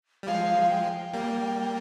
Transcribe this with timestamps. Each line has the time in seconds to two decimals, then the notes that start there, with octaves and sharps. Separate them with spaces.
0.23 G3
0.27 F3 G#3 F5
0.70 G5
1.14 G3 A#3